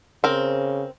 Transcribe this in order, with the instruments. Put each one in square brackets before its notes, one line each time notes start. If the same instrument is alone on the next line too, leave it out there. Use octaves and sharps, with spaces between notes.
[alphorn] C#3 [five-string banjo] C4 A#4